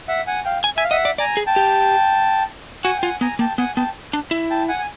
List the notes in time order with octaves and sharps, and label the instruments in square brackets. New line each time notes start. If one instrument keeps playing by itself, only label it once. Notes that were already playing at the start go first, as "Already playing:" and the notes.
[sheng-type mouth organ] E5 F#5
F#5 G#5
F5 G5
[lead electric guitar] G#5
[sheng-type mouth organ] E5 [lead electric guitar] G#5
[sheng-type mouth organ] F5
[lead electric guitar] D#5 [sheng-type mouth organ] E5 F#5
[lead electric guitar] D5
[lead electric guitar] D5 [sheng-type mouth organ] G#5 A#5
[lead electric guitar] G#4
[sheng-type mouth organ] G5 A5
[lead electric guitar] G4
[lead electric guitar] F#4 [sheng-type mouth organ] F#5 G#5
[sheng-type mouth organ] G5
[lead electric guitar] F4 [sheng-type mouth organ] F#5 G#5
[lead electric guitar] B3 [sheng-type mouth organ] G#5 A#5
[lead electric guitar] A#3 [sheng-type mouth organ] G5 A5
[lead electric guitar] B3 [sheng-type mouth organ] F#5 G#5
[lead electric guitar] B3 [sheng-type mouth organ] G5 A5
[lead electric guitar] D4
E4
[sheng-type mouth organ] G5 A5
F#5 G#5
G#5